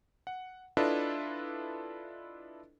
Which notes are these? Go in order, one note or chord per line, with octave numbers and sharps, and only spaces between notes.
F#5
D4 E4 F4 A4 B4 D#5